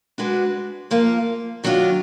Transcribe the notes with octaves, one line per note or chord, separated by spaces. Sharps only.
G#3 D4 F#4 B4
F3 A#3 F4
D#3 F#3 D4 F4